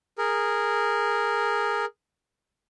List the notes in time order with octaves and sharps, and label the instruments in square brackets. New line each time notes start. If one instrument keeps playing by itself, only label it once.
[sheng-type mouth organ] G#4 A#4